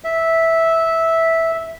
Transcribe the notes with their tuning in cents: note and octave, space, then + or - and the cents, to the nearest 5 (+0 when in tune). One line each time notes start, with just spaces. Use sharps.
E5 -10